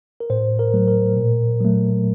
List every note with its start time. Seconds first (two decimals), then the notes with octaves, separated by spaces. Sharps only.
0.20 A#4
0.30 A2 C5
0.59 A#4
0.74 F#3 A3
0.88 A#4
1.17 A#2
1.60 F#3 A3